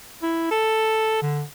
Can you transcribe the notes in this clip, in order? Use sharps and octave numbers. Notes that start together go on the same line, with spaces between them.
E4
A4
D3